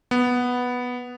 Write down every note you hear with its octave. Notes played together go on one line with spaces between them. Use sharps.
B3